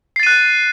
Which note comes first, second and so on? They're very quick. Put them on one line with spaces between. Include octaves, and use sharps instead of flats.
C7 A6 D#7 F#6